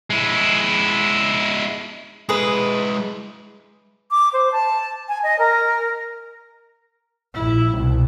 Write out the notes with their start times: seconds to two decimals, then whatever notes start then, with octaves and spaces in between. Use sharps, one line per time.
0.10 G#3 E4
2.29 G#3 E4 G#4 B4
4.11 D6
4.33 C5
4.52 A5
5.09 G#5
5.23 D#5
5.39 A#4
7.35 A#1 E4
7.76 C2 B2